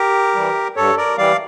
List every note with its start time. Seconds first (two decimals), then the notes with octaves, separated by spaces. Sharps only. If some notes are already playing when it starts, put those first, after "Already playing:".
Already playing: G4 A#4
0.35 E3 G3
0.76 G2 A4 C#5
0.97 A#4 D5
1.18 E3 G3 D5 F5